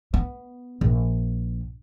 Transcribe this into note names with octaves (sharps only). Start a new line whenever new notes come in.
B3
A#1